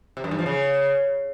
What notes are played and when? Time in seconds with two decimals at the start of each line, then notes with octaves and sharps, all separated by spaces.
0.17 C3
0.24 F#2
0.31 G2
0.39 F3
0.46 C#3